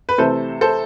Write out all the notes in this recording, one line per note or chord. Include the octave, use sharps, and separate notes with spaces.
B4
C3 E3 A3 C4 A4 C5
A4 C5